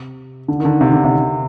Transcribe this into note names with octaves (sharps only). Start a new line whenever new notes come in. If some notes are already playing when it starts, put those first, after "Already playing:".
Already playing: C3
D3
D#3
D3
C3
D3
C3